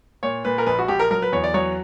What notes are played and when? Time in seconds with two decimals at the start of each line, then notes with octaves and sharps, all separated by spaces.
0.23 A#2 C#5
0.45 A#2 B4
0.58 A#4
0.66 A#1 B4
0.79 F#4
0.88 A#1 G4
0.99 A#4
1.10 F#3 A#4
1.22 B4
1.32 E2 C#5
1.44 D5
1.54 F#3 C#5